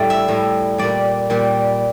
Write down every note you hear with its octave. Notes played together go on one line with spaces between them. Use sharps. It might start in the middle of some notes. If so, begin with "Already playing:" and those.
Already playing: A2 G3 D5
E5
A2 G3
A#2 G3 D5
A#2 G3